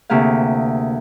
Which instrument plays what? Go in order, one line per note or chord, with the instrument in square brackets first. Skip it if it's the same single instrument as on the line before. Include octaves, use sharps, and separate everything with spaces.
[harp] D2 C3 A#3 G#4 F5